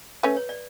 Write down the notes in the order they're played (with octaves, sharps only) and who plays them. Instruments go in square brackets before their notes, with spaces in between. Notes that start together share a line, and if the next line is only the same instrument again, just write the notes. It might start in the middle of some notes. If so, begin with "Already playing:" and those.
[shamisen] A3 C#4 [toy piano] B4
[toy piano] C#5
D5